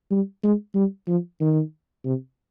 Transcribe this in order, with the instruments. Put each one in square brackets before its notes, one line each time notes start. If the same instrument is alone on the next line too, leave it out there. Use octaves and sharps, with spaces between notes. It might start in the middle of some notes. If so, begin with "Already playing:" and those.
[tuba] G3
G#3
G3
F3
D#3
C3